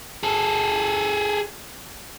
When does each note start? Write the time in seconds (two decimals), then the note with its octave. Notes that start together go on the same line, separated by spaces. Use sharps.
0.23 G#4 A4